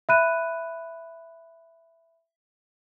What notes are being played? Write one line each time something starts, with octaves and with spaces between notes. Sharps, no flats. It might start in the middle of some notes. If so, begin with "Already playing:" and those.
E5 B5 F#6 D#7